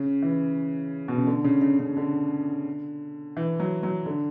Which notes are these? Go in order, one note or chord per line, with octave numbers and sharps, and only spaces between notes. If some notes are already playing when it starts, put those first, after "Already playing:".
Already playing: C#3
E3
B2
C#3
D3
C#3
C#3
C#3
D3
E3
F#3
F#3
D3